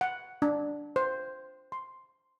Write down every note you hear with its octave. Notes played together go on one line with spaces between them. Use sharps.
F#5
D4
C5
C6